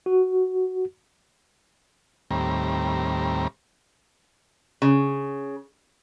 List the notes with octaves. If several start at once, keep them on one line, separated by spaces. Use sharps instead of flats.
F#4
D#2 A2 G3 C4 A#5
C#3